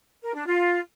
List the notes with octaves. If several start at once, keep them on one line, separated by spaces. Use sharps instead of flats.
A#4
D4
F4